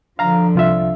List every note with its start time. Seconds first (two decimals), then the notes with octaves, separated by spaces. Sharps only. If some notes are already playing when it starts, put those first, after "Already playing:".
0.19 D3 F3 F5 A#5
0.55 C2 F4 E5